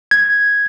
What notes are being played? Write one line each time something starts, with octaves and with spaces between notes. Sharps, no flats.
G#6